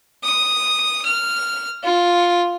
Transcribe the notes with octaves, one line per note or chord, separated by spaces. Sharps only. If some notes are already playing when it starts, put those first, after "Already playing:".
D#6
F6
F4